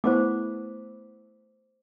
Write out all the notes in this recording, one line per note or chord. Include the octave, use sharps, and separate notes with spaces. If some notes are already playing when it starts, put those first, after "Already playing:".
A3 B3 E4 C5 D6